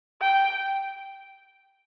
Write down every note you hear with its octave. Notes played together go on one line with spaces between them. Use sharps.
G5